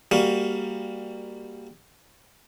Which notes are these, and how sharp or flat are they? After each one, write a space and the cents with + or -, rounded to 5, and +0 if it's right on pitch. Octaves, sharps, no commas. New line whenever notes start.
G3 +20 A#3 +0 F#4 +15